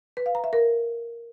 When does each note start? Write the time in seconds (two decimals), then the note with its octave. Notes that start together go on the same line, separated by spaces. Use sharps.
0.17 B4
0.26 F5
0.35 A#5
0.44 E5
0.53 A#4